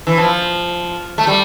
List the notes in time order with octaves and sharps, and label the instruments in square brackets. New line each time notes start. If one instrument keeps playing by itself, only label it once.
[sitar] E3
F3
A3
G3